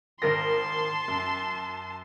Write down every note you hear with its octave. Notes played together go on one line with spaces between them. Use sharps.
G#1 A#4 A5 C6 A#6
F#2